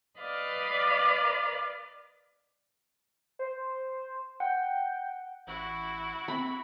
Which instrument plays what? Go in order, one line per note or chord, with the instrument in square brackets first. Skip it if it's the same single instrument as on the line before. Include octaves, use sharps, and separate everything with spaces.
[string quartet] B4 D5 D#5 F5
[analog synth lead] C5
[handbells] F#5 [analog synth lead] G5
[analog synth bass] A1 [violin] E4 F#4
[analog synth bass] C4 [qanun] B5